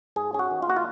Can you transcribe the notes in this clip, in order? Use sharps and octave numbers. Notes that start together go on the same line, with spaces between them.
G#2 G#4
C#4 G#4
F#4
D#3
F4
A#3 F#4
F4